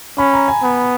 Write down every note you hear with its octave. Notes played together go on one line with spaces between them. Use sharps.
C#4 B5
A#5
G#5
B3